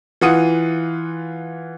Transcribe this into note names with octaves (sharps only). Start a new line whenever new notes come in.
E3 F4 F#5 D#6 D#7